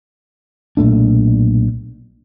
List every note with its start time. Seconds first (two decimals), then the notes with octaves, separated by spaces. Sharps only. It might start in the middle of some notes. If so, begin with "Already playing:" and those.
0.77 B1 A#2 A3 D4